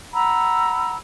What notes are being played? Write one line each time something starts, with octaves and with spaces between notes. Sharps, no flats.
F#5 A#5 B5 E6